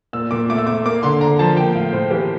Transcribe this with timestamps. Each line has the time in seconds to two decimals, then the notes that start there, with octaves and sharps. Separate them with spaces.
0.13 A#2 E6
0.31 A#2 D6
0.50 A3 D6
0.58 E6
0.67 A3 D6
0.85 A#3 D6
1.03 D3 C6
1.21 D3 A#5
1.39 F3 A5
1.57 A#3 G5
1.75 A2 F5
1.93 A2 C5
2.11 E3 G4